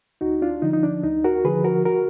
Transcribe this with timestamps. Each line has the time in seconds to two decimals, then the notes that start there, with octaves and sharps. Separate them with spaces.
0.21 D2 D#4 F#4
0.42 D4 F4
0.62 D3 F3 D#4
0.73 D#4
0.83 D4
1.03 D2 D#4
1.24 F#4 A#4
1.45 D3 F3 G#4 B4
1.64 F#4 A#4
1.85 F#4 A#4